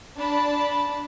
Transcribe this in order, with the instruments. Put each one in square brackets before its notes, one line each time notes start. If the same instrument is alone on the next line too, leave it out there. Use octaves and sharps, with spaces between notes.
[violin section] D4 A5 B5